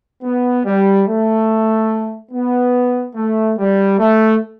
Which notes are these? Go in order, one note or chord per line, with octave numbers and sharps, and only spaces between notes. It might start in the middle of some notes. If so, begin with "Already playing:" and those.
B3
G3
A3
B3
A3
G3
A3